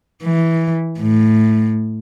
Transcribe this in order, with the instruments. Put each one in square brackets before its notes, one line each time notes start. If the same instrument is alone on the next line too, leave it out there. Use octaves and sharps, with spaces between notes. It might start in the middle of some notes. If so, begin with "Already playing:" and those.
[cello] E3
A2